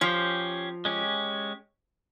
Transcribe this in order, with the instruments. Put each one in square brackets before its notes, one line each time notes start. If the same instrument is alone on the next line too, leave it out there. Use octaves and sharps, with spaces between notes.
[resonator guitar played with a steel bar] F3 [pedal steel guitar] C#4 G4 C5
[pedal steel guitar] G#3 C#4 G4